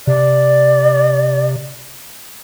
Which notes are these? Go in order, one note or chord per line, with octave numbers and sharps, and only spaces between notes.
C3 D5